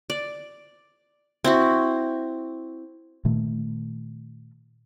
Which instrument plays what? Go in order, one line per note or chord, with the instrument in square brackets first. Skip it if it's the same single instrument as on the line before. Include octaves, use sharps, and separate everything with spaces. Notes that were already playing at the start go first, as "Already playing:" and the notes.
[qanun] D5
C4 E4 F#4
[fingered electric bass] A#2 D#3 A3